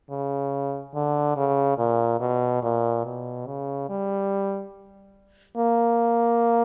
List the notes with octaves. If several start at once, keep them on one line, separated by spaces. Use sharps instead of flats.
C#3
D3
C#3
A#2
B2
A#2
B2
C#3
G3
A#3